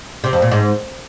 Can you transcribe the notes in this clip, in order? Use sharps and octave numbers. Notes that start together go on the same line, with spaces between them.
C3
F2
A#2
G#2